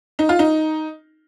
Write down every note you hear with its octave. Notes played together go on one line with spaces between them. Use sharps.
D#4
F4
D#4